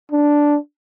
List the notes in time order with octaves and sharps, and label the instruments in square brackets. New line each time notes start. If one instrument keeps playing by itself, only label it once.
[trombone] D4